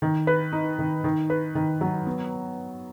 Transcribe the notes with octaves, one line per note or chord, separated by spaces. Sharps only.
D#3
B4
D#4
D#3
D#3
B4
D#3
F#3
B3